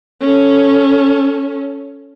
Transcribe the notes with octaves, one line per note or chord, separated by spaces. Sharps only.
C#4 A4